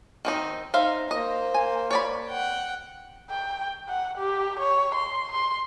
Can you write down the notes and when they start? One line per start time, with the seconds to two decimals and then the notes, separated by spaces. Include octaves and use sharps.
0.25 D#3 C4 D#4
0.74 D#4 C5 E5 F5
1.11 A#3 C5 D#5
1.54 G#5
1.91 C#5 D5 B5
2.28 F#5 G5
3.30 G5
3.89 F#5
4.18 G4
4.59 C#5
4.95 C6
5.32 C6